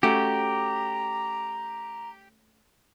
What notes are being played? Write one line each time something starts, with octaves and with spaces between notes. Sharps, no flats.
A3 C#4 F#4 G4 A#5